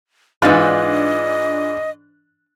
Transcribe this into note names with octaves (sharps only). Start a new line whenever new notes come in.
G#2 E3 D4 D#4 F4 D#5 F#6